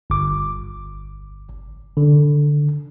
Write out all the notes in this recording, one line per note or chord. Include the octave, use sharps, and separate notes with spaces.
G1 D6
D3